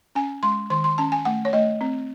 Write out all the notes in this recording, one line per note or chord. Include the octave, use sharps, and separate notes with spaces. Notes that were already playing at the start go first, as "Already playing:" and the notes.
C#4 G#5
G#3 C6
D#3 C6
C6
C#4 A5
G#5
A3 F#5
C#5
A3 D#5
C4